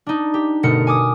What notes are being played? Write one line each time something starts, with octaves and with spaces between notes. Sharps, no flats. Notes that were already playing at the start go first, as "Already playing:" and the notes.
D4 D#4
G4
G1 B2 A3 A#4 C#7
G#5 D6 D#6